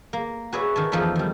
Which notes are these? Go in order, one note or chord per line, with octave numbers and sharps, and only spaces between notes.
A#3
F#4 G#4 B4 C#5 D5 E5
D#3 G#5 A5
E2 F3 D#4 A4 B5
D#3 G3